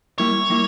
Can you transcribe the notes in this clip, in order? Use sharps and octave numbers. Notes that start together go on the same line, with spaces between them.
G3 A#3 E4 C#5
G3 A#3 E4